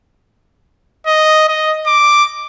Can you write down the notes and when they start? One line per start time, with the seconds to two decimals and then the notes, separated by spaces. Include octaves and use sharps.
1.07 D#5
1.48 D#5
1.87 D6